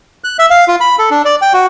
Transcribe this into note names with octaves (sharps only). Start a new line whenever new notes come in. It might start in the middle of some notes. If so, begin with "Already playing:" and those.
F#6
E5
F5
F4
B5
A4
D4
D5
G5
F#4